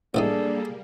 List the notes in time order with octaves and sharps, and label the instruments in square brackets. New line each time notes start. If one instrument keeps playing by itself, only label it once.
[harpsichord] A1 E3 D#4 [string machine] G3 A#3 [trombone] D4 [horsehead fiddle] G#4 A4